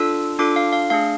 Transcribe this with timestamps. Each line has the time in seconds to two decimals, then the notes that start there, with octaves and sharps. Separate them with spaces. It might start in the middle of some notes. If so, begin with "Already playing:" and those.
Already playing: D4 F4 A4 E6
0.39 D4 F4 A4 D6
0.56 F5
0.73 F5
0.90 A3 D4 G#4 F5